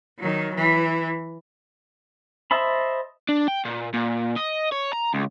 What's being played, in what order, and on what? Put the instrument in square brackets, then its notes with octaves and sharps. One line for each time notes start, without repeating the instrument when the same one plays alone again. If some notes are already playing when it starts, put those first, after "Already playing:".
[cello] D#3 F#3
E3
[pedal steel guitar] C5 D#5 E5 A5 B5
[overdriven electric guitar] D4
G5
A#2
A#2
D#5
C#5
A#5
C#2